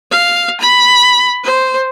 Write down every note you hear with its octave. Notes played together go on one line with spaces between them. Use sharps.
F5
B5
C5